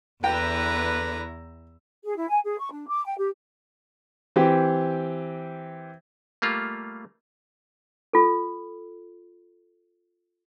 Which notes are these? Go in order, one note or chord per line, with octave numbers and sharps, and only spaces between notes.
E2 D3 E4 B4 G5 A#5
G#4
E4
G#5
G#4
C#6
D4
D6
G5
G4
E3 C4 G4
G3 A3 A#3 F4
F4 A4